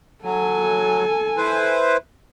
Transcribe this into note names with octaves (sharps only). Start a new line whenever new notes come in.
F#3 A4 G#5
E4 B4 C5